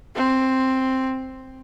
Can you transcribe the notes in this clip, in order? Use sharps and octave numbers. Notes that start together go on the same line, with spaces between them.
C4